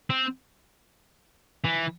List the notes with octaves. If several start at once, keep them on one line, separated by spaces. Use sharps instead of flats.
C4
E3